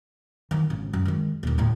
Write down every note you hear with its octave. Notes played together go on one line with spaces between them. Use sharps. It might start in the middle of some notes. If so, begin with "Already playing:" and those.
D#3 E3
G#1 C#3
F#2
D#3 G#3
D#1 D#3
D2 A2